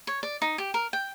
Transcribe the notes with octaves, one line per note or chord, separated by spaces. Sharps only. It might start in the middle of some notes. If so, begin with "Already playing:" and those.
C#5
D5
D#4
G4
A#4
G5